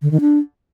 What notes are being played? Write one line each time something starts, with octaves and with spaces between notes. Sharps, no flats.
D3
D#3
D4